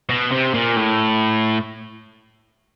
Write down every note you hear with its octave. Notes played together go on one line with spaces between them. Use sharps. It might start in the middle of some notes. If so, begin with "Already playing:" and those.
B2
C3
A#2
A2